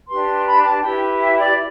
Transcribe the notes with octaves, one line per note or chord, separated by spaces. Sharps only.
D4 G4 B4 C6
B5
A5
E4 G4 B4 G5
E5
D5